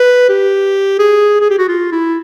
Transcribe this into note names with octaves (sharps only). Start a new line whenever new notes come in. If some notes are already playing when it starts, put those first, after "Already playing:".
Already playing: B4
G4
G#4
G#4
G4
F#4
F4
E4